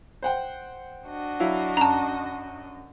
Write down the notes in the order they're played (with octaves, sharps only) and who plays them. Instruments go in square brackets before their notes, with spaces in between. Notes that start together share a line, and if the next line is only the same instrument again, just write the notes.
[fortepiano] C5 F#5 G5
[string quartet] D4 F#4 D#5
[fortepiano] F#3 E4 F5
[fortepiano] F#2 [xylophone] A5 A#5